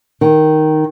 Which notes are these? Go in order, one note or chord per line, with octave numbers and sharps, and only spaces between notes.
D#3